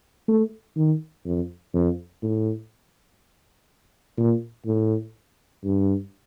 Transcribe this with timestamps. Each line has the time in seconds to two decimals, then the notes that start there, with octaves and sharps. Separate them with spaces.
0.28 A3
0.76 D#3
1.25 F2
1.74 F2
2.23 A2
4.17 A#2
4.66 A2
5.64 G2